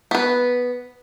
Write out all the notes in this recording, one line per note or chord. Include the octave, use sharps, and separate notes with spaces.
B3 B4